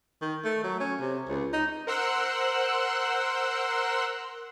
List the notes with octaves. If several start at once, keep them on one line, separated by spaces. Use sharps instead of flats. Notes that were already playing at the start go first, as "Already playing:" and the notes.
D#3
A3
F#3
C#4
C3
C#2
D#4
A#4 C5 F#5 C6 E6 F#6